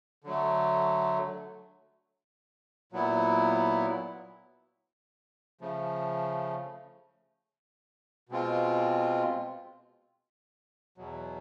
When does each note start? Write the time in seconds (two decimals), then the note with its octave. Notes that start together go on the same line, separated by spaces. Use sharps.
0.24 D3 F#3 A3
2.92 A#2 F#3 B3 E4
5.61 C#3 F3 A3
8.29 B2 G#3 C4 F4
10.98 E2 B2 F#3